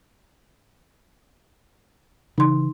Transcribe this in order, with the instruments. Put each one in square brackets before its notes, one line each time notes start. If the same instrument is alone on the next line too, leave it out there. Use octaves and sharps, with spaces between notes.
[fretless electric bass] C#3 E3 [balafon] D#4 C6